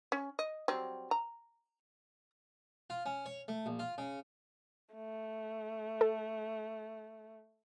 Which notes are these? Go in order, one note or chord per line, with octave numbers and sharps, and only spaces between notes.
C#4
D#5
F#3 G3 C4
A#5
F4
C#4
C#5
A3
A#1
F4
C#3
A3
A4